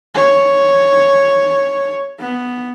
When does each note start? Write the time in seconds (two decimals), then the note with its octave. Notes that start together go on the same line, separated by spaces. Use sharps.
0.15 C#5
2.19 B3